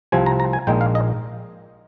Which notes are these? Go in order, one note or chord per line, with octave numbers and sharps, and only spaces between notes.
C2 C3 F3 C4 G#5
A#5
A#5
G#5
A#1 A#2 G#3 D#4 G5
F5
D#5